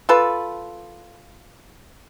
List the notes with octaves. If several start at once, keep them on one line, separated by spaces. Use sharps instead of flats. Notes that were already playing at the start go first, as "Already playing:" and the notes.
F4 A4 B4